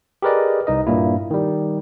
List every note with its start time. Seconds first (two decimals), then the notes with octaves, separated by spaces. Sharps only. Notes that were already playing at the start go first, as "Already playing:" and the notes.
0.22 G4 G#4 A#4 B4 D5 D#5
0.67 C2 D#4 D#5
0.87 G2 A#2 A#3 E4
1.31 D#3 G3